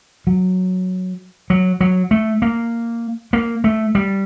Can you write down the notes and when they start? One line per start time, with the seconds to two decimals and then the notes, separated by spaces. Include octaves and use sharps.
0.27 F#3
1.50 F#3
1.80 F#3
2.11 A3
2.42 A#3
3.33 A#3
3.64 A3
3.95 G3